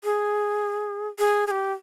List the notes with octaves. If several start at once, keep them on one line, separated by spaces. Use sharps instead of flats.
G#4
G#4
G#4
G4